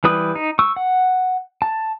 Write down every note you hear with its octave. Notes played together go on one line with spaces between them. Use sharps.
E3 G3 B4 D#6
D#4
C#6 E6
F#5
A5